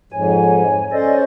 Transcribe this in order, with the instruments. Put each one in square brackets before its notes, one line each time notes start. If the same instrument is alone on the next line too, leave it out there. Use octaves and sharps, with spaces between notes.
[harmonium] F2 G#2 [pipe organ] C#5 G#5
[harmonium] C#4 C5 [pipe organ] A4 D5 D#5